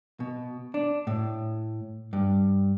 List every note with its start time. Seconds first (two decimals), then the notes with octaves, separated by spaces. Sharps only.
0.20 B2
0.74 D4
1.07 A2
2.13 G2